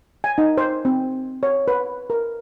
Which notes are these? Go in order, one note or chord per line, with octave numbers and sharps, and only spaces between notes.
G#5
D#4
C5
C4
C#5
B4
A#4